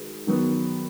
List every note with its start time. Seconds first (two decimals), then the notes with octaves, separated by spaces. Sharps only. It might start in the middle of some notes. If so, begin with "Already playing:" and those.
Already playing: D#3 G#3 F#4 B4
0.27 D#3 F#3 B3